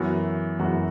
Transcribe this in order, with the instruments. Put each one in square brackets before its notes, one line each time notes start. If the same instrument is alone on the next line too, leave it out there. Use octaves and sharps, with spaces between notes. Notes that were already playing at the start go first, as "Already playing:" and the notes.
Already playing: [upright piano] F#2 E3 B3 F#4
F#2 E3 B3 F#4